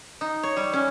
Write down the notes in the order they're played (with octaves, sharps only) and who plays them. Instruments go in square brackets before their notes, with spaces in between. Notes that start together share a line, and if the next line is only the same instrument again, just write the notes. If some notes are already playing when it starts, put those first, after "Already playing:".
[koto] D#4
C#5
G3
C#4